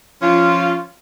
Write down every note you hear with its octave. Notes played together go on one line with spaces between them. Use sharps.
F3 C#4 F4